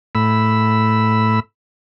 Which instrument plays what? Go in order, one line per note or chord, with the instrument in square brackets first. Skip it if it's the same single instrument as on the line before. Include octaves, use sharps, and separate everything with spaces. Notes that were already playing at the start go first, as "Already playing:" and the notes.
[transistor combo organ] A2 B5 E6